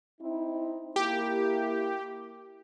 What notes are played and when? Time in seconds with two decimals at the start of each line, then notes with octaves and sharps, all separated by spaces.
0.21 C4 D#4 E4
0.96 A#3 E4 G4